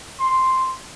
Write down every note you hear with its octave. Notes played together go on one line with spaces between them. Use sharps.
C6